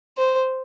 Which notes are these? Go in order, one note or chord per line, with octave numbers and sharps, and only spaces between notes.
C5